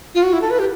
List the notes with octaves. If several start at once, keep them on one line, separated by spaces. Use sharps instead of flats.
F4
F#4
E4
A4
B4
G4